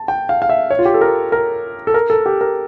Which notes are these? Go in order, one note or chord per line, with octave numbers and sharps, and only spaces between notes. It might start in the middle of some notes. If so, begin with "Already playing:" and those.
Already playing: A5
G5
F5
F5
E5
C#5
F4
G4
A4
A#4
A#4
A4
A#4
A4
G4
A#4